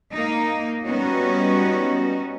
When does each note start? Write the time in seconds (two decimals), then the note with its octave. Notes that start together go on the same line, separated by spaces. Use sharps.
0.12 A#3 D#4
0.84 G3 B3 C#4 D#4 F#4